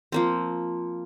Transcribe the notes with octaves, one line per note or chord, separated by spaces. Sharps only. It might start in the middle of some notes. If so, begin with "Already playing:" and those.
F3 A#3 C4